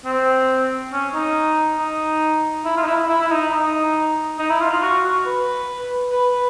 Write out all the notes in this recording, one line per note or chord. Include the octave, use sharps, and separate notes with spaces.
C4
C#4
D#4
D#4
E4
F4
D#4
E4
E4
E4
D#4
D#4
D#4
E4
F4
F4
F#4
F#4
B4
B4